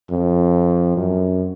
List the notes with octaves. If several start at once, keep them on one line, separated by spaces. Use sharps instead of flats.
F2
F#2